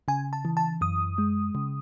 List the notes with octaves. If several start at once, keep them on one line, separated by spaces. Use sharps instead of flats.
C#3 G#5
A5
E3
A5
F#2 D#6
G#3
C#3